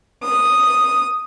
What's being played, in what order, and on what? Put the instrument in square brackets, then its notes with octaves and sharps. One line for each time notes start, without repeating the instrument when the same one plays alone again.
[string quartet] D#6